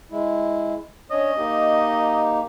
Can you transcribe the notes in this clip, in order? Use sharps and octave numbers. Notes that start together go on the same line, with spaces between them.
G#3 E4
C#4 D4 C#5 D#5
A#3 D#4 G4